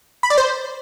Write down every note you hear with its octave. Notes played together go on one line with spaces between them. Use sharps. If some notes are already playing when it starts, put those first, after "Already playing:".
B5
D5
C5